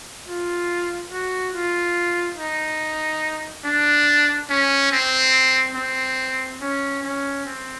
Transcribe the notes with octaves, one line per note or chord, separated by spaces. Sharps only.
F4
F#4
F4
D#4
D4
C#4
C4
C4
C#4
C#4
C4